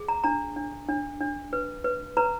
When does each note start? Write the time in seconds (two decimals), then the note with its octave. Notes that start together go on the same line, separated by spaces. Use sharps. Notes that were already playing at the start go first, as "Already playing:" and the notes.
Already playing: G#4
0.08 A#5
0.24 D4 A#5
0.56 D4
0.89 D4
1.20 D4
1.53 B4
1.84 B4
2.17 B4 A#5